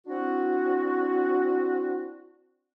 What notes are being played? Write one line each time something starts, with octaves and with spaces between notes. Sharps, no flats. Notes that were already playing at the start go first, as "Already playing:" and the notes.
C4 D4 E4 F#4